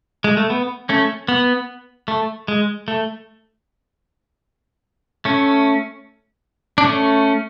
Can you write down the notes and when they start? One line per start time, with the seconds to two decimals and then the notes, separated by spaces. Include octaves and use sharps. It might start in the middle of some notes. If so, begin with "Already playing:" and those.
0.24 G#3
0.37 A3
0.50 B3
0.89 A3 C#4
1.28 B3
2.08 A3
2.48 G#3
2.88 A3
5.25 A3 C#4
6.78 D4
6.84 A3 C#4